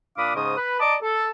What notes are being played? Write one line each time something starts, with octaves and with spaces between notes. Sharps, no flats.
A#2 D4 F5 B5 D6 D#6
G#2 C#3 C5 D#5 D#6
B4
D5 D#5 A5 A#5 D6
A4